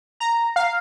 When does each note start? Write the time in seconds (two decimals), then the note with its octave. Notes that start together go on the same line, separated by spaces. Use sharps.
0.20 A#5
0.56 F5